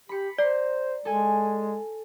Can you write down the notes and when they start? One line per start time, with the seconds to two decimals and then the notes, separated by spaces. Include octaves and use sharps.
0.09 G4 B5 C#7
0.38 C5 D5 A#5 C7
1.05 G#3 A4 G#5